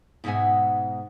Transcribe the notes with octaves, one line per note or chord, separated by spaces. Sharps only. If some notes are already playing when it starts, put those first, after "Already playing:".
G#2 B2 D#4 E5 F#5 G#5